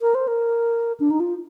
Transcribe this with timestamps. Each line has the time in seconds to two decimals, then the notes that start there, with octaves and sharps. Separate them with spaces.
0.01 A#4
0.14 C5
0.27 A#4
1.00 D4
1.10 D#4
1.20 F4